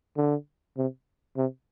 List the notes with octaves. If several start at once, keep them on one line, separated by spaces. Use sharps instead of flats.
D3
C3
C3